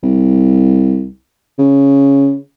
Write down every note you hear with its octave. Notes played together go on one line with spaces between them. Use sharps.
C2
C#3